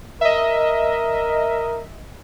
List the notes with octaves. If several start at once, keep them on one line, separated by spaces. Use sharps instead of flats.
A#4 D#5 E5